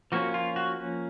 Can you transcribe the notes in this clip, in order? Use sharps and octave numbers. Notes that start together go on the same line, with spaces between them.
F3 A#3 C#4 F#4
F4
F#4